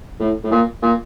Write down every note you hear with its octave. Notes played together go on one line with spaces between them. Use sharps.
A2
A2
A#2
A#2